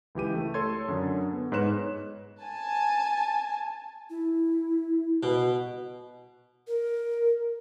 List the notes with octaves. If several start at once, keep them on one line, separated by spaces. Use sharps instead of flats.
C#2 E3 G4 D#7
A3
A4 C#5 C6 G#6
F#2 D3
B3
G#2 B4 C#5 F#6 E7
G#5 A5
E4
B2
A#4